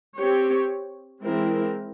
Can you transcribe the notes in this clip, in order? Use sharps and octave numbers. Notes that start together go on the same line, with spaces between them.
C4 G4 C#5
E3 G#3 C4 E4 A#4